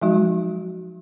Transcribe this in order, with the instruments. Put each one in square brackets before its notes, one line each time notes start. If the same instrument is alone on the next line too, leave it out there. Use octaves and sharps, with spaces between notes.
[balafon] F3 F#3 G#3 D#4 F#4